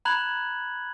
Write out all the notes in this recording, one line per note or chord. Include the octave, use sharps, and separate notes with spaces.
A#5 B5 F#6 G#6 F#7